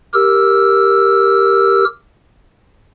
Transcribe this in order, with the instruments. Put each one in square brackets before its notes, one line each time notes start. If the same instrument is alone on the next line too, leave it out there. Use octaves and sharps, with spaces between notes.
[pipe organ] G4 A#4 E6